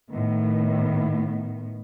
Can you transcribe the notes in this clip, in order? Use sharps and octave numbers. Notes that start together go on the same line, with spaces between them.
A2 D#3 B3